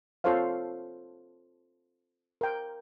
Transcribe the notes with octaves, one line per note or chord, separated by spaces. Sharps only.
C4 F4 A4 C5 C#5 F5
A#4 G5